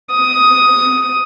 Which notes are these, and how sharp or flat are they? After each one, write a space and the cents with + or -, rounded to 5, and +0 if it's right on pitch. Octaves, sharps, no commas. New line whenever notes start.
D#6 +5